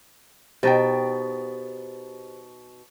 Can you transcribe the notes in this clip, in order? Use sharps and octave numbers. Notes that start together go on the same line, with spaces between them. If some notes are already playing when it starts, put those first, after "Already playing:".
B2 D#4 G4 C5 G5 A6